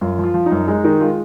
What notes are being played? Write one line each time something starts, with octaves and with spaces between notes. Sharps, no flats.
F#2 F4
F3
F4
F3
D#4
F#2
G#3 D#4
D#3 D#4
G#3 F4